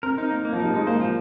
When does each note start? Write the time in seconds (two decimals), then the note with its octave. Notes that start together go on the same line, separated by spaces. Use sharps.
0.03 C4 A#4
0.18 D#4
0.31 A#3
0.45 A#3
0.53 F3
0.60 G3 D#4
0.74 G#3 D#4
0.87 A#3 C5
1.01 F3